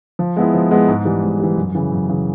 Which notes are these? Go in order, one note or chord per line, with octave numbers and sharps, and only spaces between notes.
F3
G#3 B3 E4
F3
G#3 B3 E4
G#2
E3 G3
G#2
E3 G3
F#2
C#3 E3
F#2
C#3 E3